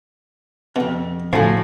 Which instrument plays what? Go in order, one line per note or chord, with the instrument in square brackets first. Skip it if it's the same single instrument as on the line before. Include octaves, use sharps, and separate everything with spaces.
[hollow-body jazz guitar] F2 G#2 [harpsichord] B2
[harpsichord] D2 F3 [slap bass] A2 [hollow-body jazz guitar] F#4 G#5